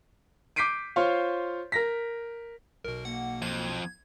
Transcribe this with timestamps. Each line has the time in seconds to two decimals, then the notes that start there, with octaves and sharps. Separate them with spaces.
0.56 D6 G6 B6 C7 D7 D#7
0.96 F4 C5 C#5 F5
1.72 A#4 A#6 B6
2.84 B1 B2 A#4
3.05 A#3 F#5
3.42 F2 G#6